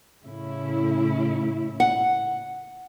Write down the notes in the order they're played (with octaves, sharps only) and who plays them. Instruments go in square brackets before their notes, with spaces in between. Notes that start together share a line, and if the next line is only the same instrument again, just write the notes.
[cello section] A2 C#3 E4
[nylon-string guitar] F#5